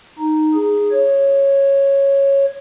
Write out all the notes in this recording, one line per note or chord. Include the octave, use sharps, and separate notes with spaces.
D#4
G#4
C#5